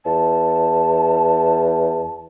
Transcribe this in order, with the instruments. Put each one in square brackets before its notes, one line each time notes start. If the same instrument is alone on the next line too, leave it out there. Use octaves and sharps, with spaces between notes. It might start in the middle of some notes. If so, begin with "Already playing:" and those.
[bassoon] E2 [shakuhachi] A5